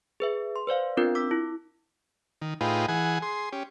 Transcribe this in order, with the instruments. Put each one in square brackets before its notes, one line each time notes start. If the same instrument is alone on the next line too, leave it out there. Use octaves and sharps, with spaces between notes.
[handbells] G#4 B4 E5
C6
B4 C5 D5 F5
B3 C4 D4 F4 A#4 G6
D6 E6 B6
E4
[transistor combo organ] D#3
A2 D#4 F4 G#4 B4 G5
E3 G#4 F#5 G#5
G#4 C6
C#4 G4